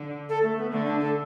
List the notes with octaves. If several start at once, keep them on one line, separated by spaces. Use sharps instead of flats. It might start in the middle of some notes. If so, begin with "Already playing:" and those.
Already playing: D3
A4
A3
B3
D3 A3
D4
A4